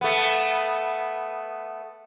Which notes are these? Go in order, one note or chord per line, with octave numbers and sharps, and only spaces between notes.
A3 B3